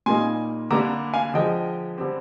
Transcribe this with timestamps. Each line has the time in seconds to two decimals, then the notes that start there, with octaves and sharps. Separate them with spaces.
0.06 A#2 G3 A#3 D#4 G#5 C6
0.71 D3 G3 A#3 D4 A#5 D6
1.13 F5 G#5
1.34 D3 F3 G#3 D#5 G5
1.98 D3 G3 C4